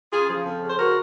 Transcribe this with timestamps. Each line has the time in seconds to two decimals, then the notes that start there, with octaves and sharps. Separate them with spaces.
0.12 C#3 F4 G#4
0.29 F3
0.45 F2
0.62 C#3
0.70 C5
0.78 F#4 A#4